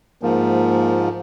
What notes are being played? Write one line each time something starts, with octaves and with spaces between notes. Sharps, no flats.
G#2 F3 A#3